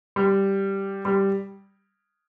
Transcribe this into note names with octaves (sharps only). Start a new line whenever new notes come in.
G3
G3